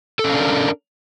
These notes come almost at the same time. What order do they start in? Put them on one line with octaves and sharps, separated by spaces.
A4 C#4 F5 D4 A#4